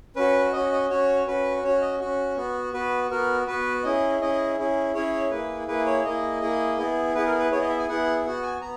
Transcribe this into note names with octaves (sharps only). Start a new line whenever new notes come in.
C#4 F#4 B4
C#4 F#4 D#5
D#5
C#4 F#4 C#5
C#4 F#4 B4
C#4 F#4 C#5
D#5
C#4 F#4
B3 F#4
B3 F#4 B4
B3 F#4 A#4
B3 F#4 B4
C#4 E4 G#4 D#5
C#4 E4 G#4 D#5
C#4 E4 G#4
C#4 E4 G#4 C#5
A#3 E4 G#4 B4
A#3 E4 G#4 B4
C#5
A#3 E4 G#4 D#5
A#3 E4 G#4
B3 E4 G#4
B3 E4 G#4 B4
A#4
B4
B3 E4 G#4 C#5
D#5
E5
G#5
B3 E4 G#4 F#5
B3 F#4 F#5
G#5
B3 A#5